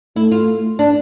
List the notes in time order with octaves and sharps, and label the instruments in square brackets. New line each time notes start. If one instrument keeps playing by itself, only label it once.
[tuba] A3 [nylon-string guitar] E4
[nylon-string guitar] F4
D4